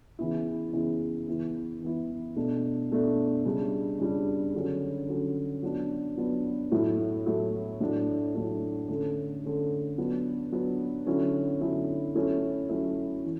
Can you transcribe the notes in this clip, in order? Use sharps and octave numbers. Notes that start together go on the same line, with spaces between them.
C#3 E3 B3 E4
C#3 E3 B3 E4
E3 B3 E4
E3 B3 E4
B2 A3 D4
B2 A3 D4
C#3 G3 D4
C#3 G3 D4
D3 F#3 C#4
D3 F#3 C#4
F#3 B3 D4
F#3 B3 D4
A2 F#3 A3 E4
A2 F#3 A3 E4
A2 F#3 A3 D4
A2 F#3 A3 D4
D3 A3 C#4
D3 A3 C#4
F#3 B3 D4
F#3 B3 D4
D3 F#3 C#4 E4
D3 F#3 C#4 E4
F#3 A3 C#4 E4
F#3 A3 C#4 E4
E3